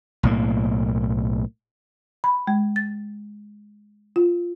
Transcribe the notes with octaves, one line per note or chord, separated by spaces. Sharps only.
B1 A2 A#3
B5
G#3
A6
F4